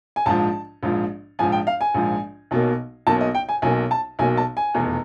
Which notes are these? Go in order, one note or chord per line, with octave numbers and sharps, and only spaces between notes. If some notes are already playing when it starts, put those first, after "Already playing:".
G#5
A#1 G#2 F3 A5
A#1 G#2 F3
A#1 G#2 F3 G#5
G5
F5
G#5
A#1 G#2 F3
B1 B2 F#3 A#3
B1 B2 F#3 A#3 A5
D#5
G5
G#5
B1 B2 F#3 A#3 G#5
A5
B1 B2 F#3 A#3 G#5
A5
G#5
F1 E2 B2